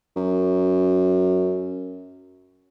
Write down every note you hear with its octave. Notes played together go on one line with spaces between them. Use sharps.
F#2